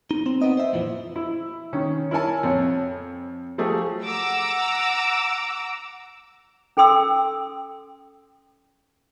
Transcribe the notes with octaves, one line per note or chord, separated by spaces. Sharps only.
D#4
C4
B3 C4 D#5
C5 E5
F2 A#2 E3 F3
E4
D#3 C#4
E4 A#4 C#5 G#5 A5
F2 C#5
F3 F#3 A3 G4 G#4
F#5 A#5 D6 E6
C#4 A4 G5 C6 D#6 E6